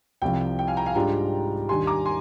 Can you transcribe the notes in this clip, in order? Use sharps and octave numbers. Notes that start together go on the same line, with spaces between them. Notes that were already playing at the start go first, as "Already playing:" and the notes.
C2 C3 F3 G5
G5
F5 G#5
G5 A#5
F5 G#5
G#2 G3 D4 F4 G5 A#5
D#2 D#3 G3 D4 G4 G#5 C6
A#5 D6
G#5 C6